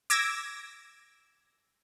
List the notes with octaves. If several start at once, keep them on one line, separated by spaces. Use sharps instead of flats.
D6 E6 G#6 A#6